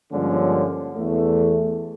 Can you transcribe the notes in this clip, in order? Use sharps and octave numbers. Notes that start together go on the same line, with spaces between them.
G2 D3 F3 G#3 A#3 C#4
E2 A3